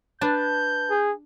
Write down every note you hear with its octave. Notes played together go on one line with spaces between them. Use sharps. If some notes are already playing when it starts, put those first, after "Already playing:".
D4 B4 A5 G6
G#4